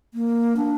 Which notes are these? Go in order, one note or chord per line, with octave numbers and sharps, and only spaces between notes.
A#3
D4